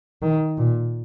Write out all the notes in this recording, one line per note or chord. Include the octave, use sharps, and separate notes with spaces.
D#3
A#2